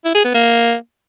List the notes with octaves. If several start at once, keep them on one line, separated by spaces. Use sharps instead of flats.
E4
G#4
B3
A#3